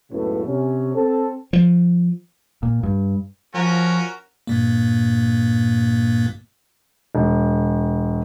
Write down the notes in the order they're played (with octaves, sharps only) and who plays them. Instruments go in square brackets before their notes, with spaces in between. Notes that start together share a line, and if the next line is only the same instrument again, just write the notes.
[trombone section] C#2 F#2 A2 C#3 A3 B3
C3 C#4
C4 A4
[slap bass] F3
[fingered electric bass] A#2
G2
[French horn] F3 [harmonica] C#4 F#4 A#4
[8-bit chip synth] G2 A#2 A#3
[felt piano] E1